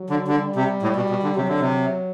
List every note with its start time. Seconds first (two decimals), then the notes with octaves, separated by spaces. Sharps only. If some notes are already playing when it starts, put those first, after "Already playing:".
Already playing: F#3
0.10 D3
0.28 D3 G3
0.56 C3
0.83 A2
0.96 B2
1.10 B2
1.23 D3
1.36 C3 F#3
1.49 D3
1.60 C3